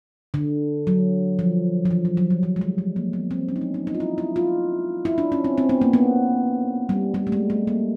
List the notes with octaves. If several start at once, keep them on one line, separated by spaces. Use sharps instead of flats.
D3
F#3
F3
F3
E3
F#3
F#3
G3
F3
G#3
G3
G#3
A#3
B3
C4
C#4
D#4
D4
D#4
D#4
F4
E4
E4
F4
E4
D4
C#4
C4
C4
B3
A#3
B3
G3
G3
A3
G#3
A3
A#3